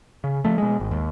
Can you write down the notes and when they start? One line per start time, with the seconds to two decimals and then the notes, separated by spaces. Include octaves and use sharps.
0.24 C#3
0.45 F3 A3
0.58 B2 G#3
0.80 G#1
0.91 D#2